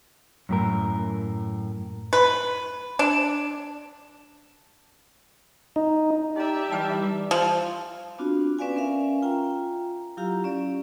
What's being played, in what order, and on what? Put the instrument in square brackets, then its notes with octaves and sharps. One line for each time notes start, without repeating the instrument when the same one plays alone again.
[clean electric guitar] F#2 A2 A#4
[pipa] B4
D4
[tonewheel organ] D#4
[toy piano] D#4 A#5 [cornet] G4 [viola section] D5 E5
[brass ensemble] E3 G3 [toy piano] B4 G5 A5
[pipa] F3
[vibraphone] B3 C4 D4 F4 F#4
C#4 B4 D5 F5 G#5
C#4 A#4 E5 F5 G#5
F4 G5 A#5
F#3 E4 F4 G4 F5 A#5
C#4 D5